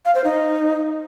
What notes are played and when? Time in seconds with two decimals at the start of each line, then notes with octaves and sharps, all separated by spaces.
0.05 F5
0.15 C5
0.24 D#4